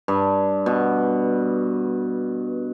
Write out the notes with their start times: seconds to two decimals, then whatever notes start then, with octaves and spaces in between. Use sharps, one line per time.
0.08 G2
0.66 B2